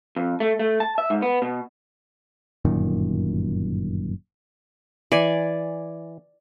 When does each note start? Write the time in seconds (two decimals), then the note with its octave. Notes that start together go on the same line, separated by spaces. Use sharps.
0.17 F2
0.40 A3
0.59 A3
0.80 A5
0.98 E5
1.10 G#2
1.22 B3
1.42 B2
2.65 G1 F#2 A#2 D#3
5.12 E3 D5 G#5